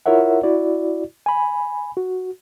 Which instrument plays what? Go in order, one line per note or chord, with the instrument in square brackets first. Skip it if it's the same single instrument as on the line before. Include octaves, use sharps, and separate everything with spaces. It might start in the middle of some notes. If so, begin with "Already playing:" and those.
[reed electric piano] E4 F4 A#4 C#5 E5 F#5
E4 F#4 D5
G#5 B5
F#4